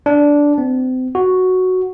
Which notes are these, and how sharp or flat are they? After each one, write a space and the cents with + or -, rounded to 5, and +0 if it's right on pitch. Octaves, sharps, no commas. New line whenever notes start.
D4 -10
C4 -35
F#4 +0